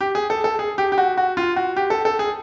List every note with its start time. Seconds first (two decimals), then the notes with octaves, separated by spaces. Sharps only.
0.01 G4
0.15 G#4
0.30 A4
0.44 A4
0.59 G#4
0.78 G4
0.92 G4
0.98 F#4
1.17 F#4
1.37 F4
1.56 F#4
1.76 G4
1.90 A4
2.05 A4
2.19 G#4